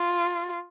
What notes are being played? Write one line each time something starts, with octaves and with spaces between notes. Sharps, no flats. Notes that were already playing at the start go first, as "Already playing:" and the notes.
Already playing: F4